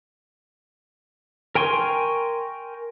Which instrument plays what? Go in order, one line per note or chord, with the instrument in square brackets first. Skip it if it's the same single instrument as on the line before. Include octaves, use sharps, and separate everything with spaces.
[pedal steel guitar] A#4 G5 G#5 C6 C#6